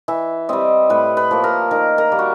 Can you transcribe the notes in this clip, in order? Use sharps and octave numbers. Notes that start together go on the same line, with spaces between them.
E3 E5
G3 C4 D#5
A2 B4
B4
F3 A#3
A#4
D#3 A#4
A#4
G3 A#3
F#4